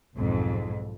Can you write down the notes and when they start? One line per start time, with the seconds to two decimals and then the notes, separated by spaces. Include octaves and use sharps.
0.16 B1 F2 G#2